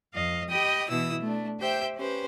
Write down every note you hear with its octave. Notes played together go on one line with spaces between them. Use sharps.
F2 D#5 F5
G4 D#5 G5 B5 D#6
B2 E3 E4 D#6 E6
A3 D4
G4 C5 E5 G5 G6
C#4 G4 B4 C5